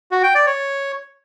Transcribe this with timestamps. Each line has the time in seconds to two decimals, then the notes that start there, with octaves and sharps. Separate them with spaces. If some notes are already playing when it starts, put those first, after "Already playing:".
0.11 F#4
0.23 G5
0.35 D5
0.47 C#5